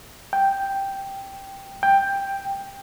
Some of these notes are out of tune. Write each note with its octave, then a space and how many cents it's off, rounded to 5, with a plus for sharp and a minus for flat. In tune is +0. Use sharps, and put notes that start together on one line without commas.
G5 +0
G5 +10